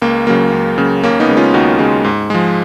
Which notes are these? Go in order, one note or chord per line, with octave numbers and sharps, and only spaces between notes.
C#2 A#3
C#3 F#3 A#3
C#2
C#3 F#3 A#3
D#2 A#3 C#4
B3 D#4
C#3 G#3
C#4 F4
D#2 D#4 F#4
C#3 G#3
G#2
F3 G#3